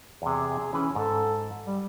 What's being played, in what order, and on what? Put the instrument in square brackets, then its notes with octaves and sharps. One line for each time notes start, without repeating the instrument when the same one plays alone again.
[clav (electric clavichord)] E2 C3 [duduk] G#4
[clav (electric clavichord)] E3 B4 [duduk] C#4
[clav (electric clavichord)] G#2 [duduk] A4
[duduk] G3